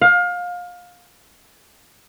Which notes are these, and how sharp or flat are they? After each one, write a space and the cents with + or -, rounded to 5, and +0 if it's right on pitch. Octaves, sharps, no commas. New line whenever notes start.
F5 +25